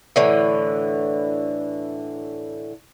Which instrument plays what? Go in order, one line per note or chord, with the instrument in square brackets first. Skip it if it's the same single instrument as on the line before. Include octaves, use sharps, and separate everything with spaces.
[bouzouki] A2 D3 E3